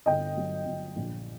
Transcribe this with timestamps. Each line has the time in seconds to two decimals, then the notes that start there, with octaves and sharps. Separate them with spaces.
0.06 G1 D#5 G5
0.37 F#3
0.66 G1
0.96 A#1